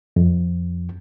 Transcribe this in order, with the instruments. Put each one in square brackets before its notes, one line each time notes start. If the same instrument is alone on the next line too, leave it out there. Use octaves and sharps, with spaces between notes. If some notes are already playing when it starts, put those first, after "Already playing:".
[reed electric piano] F2